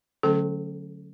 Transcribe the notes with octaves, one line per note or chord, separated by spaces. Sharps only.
D3 F#3 A3 C#4 A4